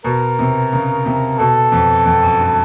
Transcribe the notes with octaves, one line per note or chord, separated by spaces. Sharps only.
B2 A#4
C3
C#3
C3
B2 A4
F2
F2
F#2
G2